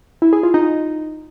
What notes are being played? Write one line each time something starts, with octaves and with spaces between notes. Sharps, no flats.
E4
G#4
F4
D#4